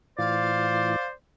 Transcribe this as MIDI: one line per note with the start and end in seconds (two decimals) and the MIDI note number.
0.18 0.96 45
0.18 0.96 52
0.18 0.96 65
0.18 1.14 72
0.18 1.13 74
0.18 1.08 77